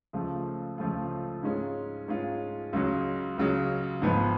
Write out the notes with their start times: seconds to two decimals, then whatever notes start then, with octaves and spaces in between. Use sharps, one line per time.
0.13 C#2 C#3 F3 A3 F4
0.78 C#2 C#3 F3 A3 F4
1.43 G#2 G#3 C#4 F4
2.08 G#2 G#3 C#4 F4
2.73 C#2 C#3 F#3
3.38 C#2 C#3 F#3
4.02 G#1 G#2 F3 B3